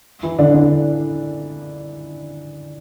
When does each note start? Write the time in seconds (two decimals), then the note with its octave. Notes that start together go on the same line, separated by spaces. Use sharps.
0.23 E3 E4
0.39 D3 D4
0.54 D3 D4